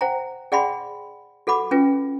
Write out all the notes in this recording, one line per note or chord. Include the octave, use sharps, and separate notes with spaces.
C5 F#5 G5 A#5
G#4 D5 F#5 G5 B5 C6
F#4 A4 F#5 B5 D6
C#4 F4 B4 G5